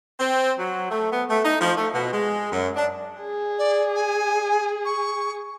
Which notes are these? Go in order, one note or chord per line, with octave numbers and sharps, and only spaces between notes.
C4
F#3
A3
B3
A3
D#4
F3
A3
B2
G#3
F#2
D4
G#4
D5
G#5
C#6